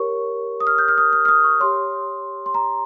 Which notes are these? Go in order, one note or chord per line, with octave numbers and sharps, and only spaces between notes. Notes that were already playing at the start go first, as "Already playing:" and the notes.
Already playing: G4 A#4 C#5 C#6
D#6
F6
G6
F6
D#6
F6
F6
D#6
C#6
G4 C#5 C6
C6
A#5